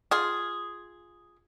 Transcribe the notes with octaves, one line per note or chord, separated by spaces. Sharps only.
F4 G#4